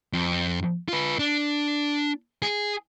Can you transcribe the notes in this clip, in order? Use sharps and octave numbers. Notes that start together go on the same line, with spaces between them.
F2
F4 B4
D4
G#4